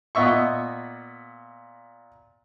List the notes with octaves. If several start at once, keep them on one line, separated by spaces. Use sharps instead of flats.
A#2 B3 D#5 E5 C#6